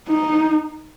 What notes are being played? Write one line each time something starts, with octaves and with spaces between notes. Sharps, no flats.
D#4